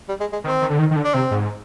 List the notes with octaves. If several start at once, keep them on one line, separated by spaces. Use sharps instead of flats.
G3
G#3
G#3
D#3 C4
D#3
D3
D#3
D#3
D3
D4
C3 C4
G#2